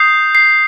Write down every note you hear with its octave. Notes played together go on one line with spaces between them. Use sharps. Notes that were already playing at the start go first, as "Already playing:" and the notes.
Already playing: D#6 G6 C7
C7